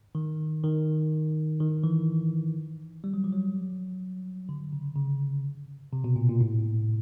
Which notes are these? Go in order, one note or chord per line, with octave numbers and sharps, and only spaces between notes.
D#3
D#3
D#3
E3
G3
F#3
F3
F#3
D3
C#3
C#3
C3
B2
A#2
A#2
A2